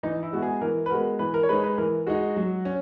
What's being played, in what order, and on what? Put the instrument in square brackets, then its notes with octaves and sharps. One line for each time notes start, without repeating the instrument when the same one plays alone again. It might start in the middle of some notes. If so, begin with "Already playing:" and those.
[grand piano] E3 [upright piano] D#4
[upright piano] E4
[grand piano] G#3 B3 F#4
[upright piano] G#4
[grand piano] E3 [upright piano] A#4
[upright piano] B4
[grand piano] G#3 B3 F#4 [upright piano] A#4
[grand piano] E3 [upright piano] B4
[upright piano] A#4
C#5
[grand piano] G#3 D#4 [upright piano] B4
[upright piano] B4
[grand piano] E3 [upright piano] A#4
[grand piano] G#3 D#4 [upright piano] F#4
[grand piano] F#3
C#4